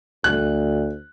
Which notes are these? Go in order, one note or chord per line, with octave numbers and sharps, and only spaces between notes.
D2 F#6